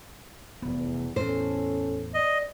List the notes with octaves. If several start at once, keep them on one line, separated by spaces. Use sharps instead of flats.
F1 E2 B3
E2 A2 C#4 A4 C5
D5 D#5